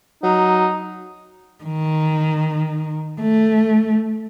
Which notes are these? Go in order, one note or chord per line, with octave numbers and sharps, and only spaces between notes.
F#3 D#4
D#3
A3